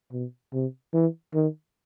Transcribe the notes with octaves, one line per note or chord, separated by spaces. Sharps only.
B2
C3
E3
D#3